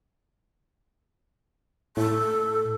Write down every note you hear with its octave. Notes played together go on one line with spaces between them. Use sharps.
A2 A4